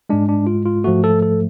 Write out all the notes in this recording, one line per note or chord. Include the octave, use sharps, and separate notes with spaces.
G#2 G#3 D4
D4
F4
F4
G#2 F3 A3 F#4
A4
A4